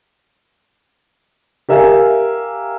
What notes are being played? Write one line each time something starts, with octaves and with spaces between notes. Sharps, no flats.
G4 A#4 E5 F5 G#5